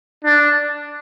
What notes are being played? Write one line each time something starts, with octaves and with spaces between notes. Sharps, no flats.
D4